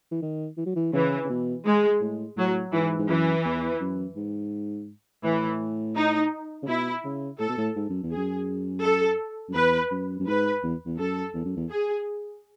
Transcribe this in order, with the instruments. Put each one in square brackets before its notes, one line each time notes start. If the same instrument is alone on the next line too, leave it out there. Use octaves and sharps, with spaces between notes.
[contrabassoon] E3
D#3
E3
F#3
E3
[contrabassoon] C#3 [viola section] E3
[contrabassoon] C#3
B2
[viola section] G#3
[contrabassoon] A2
[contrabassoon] A2 [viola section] F#3
[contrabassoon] G#2 [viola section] E3
[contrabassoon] G#2
[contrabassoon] F#2 [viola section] E3
[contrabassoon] E2
F#2
G#2
[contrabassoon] A2 [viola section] E3
[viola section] D#4
[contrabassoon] C#3
[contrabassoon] B2 [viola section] E4
[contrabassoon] C#3
[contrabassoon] A2 [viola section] A4
[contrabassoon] B2
A2
G#2
F#2
E2
[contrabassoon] F#2 [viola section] G#4
[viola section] A4
[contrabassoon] F#2
[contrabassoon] E2 [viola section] B4
[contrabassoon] F#2
F#2
[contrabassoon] G#2 [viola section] B4
[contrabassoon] E2
E2
[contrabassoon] F#2 [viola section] A4
[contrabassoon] E2
F#2
E2
[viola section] G#4